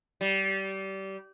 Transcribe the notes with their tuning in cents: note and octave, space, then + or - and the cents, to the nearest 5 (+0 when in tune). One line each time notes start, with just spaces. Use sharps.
G3 -25